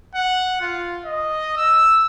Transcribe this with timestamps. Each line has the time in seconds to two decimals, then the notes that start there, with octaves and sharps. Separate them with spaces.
0.15 F#5
0.61 F4
1.05 D#5
1.57 E6